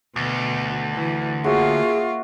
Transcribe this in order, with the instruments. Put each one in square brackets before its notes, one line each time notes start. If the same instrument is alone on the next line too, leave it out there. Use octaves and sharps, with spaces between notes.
[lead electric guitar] D2 [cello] B2
[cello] E3
[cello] A#3 F4 [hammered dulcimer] F#4 C#5 E5 [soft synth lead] G#4